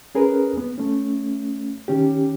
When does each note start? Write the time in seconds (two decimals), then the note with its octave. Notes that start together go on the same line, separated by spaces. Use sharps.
0.15 C#4 G#4 A#4 B4
0.57 B3
0.78 A3 C#4
1.88 D#3 C#4 G4